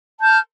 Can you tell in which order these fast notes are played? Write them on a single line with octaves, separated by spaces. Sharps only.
A5 G6 F6